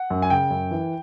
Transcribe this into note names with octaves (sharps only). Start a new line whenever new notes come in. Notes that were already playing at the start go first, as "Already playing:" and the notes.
Already playing: F#5
F#2
G#5
C#3 G5
F#2
E3